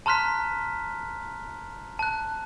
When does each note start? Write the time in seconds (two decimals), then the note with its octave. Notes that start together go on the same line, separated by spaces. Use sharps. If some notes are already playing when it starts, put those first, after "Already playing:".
0.06 A5 A#5 C6 F6 F#6 B6
1.99 A5 F#6